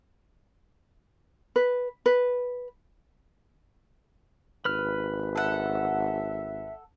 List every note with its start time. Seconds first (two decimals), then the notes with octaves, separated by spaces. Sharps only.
1.56 B4
2.06 B4
4.65 G#1 B4 F6
5.36 A4 E5 F#5